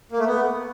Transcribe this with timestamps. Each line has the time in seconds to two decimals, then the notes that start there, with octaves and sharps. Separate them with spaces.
0.12 A#3
0.19 A3
0.26 B3